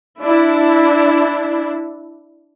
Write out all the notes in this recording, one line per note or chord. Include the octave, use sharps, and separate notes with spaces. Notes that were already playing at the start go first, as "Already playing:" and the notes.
D4 E4